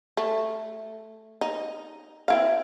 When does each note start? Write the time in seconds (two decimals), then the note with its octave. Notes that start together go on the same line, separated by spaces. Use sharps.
0.17 A3
1.41 D#4
2.28 C4 E4 F5